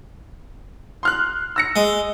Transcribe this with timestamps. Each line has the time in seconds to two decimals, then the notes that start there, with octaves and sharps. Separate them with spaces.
1.03 C6 F6 F#6
1.56 E6 A#6 C#7
1.76 G#3